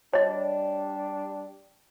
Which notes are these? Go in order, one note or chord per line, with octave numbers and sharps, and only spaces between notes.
G3 D4 C#5 D#5